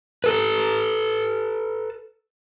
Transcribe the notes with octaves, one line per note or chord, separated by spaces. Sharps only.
A4 B4